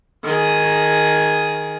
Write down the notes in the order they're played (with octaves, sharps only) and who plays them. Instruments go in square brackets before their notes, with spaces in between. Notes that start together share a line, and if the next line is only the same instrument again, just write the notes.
[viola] D#3 G#4